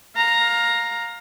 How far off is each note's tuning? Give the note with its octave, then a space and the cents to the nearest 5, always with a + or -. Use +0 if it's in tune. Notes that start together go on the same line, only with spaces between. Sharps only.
F5 +20 A#5 +0